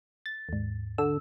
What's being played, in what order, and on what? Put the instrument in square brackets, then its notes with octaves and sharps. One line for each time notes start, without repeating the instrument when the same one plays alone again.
[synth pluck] A6
D#2 G#2
[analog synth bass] D3 [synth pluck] E6